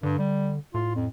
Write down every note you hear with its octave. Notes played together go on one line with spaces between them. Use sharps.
G2 D3
G3
A2 F4
F2